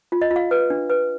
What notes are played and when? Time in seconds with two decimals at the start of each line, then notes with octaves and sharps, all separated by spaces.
0.12 F4
0.22 D#5
0.31 F4
0.36 F5
0.51 B4
0.70 D4
0.90 B4